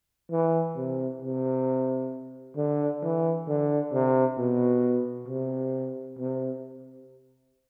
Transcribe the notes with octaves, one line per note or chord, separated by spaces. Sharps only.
E3
C3
C3
D3
E3
D3
C3
B2
C3
C3